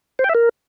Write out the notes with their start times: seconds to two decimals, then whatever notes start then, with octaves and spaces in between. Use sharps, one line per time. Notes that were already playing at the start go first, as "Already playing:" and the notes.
0.19 C5
0.24 G5
0.29 E5
0.35 A#4